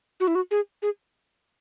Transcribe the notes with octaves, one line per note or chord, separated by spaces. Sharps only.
F#4
E4
F#4
G#4
G#4